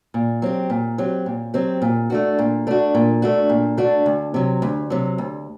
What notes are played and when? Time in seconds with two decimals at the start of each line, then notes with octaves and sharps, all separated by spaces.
0.14 A#2
0.42 F#3 C4 G4
0.70 A#2
0.98 F#3 C4 G4
1.26 A#2
1.54 F#3 C4 G4
1.82 A#2
2.10 A3 D4 F#4
2.39 A#2
2.67 A3 D4 F#4
2.95 A#2
3.22 A3 D4 F#4
3.49 A#2
3.77 A3 D4 F#4
4.06 D2
4.34 C3 F#3
4.62 D2
4.90 C3 F#3
5.18 D2